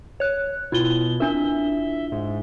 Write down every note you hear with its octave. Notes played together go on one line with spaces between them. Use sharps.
C#5 F#6
B2 E4 F4 G7
D4 A#4 E5
G#2